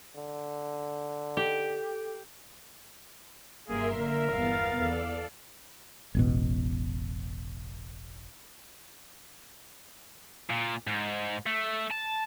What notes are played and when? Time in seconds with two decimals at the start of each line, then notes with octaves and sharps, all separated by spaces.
0.16 D3
1.37 G4 A4
3.68 F#1 G2 A#3 G#4 A#4 E5 C6
3.99 D3 A#3 A#4 E5
4.32 G1 E2 B3 F5 A6
4.77 E2 A4 D5
6.15 E1 A1 B2
10.50 A#2
10.87 G#2
11.46 A3
11.91 A5